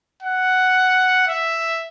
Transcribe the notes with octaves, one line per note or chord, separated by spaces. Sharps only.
F#5
E5